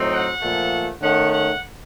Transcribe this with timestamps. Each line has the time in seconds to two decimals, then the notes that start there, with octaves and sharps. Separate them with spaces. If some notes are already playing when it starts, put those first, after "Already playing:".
Already playing: A2 F#3 C4 D#4
0.12 F#5
0.41 A#2 F3 A3
1.02 D#3 A3 C#4 F#5
1.33 F#5